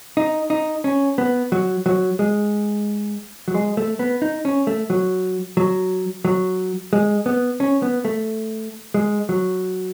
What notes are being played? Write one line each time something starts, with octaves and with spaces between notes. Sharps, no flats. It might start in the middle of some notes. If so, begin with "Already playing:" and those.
D#4
D#4
C#4
B3
F#3
F#3
G#3
F#3
G#3
A3
B3
D#4
C#4
A3
F#3
F#3
F#3
G#3
B3
C#4
B3
A3
G#3
F#3